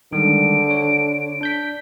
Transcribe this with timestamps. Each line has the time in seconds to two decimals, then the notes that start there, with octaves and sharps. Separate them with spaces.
0.13 D3 D#3 G3 G#3 D7
0.70 C#5
1.41 D4 G6 B6